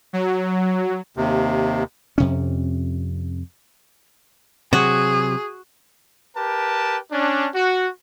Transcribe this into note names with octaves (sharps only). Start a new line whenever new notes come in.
F#3
D#2 C3
F2 C3 C#4
C3 F#3 F#4 G#4
G4 A#4 B4 A5
C#4 D4
F#4